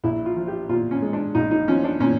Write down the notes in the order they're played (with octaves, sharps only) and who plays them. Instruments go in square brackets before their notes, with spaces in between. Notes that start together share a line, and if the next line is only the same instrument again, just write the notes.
[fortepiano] A#1 E4
F4
F3
G4
A#2 F4
C#4
G#3
D4
A#1 D#4
D#4
F3 C#4
D4
A#2 C#4